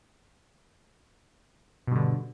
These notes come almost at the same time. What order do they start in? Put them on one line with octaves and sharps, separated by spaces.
B2 G2 D3